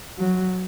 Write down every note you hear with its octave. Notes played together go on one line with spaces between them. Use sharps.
F#3